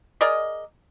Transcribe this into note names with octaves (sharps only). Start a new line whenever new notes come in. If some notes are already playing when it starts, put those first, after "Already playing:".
G#4 A#4 D5 D#5